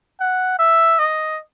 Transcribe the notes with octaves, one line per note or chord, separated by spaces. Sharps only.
F#5
E5
D#5